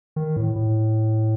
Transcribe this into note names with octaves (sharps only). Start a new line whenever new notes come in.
D#3
A2
A2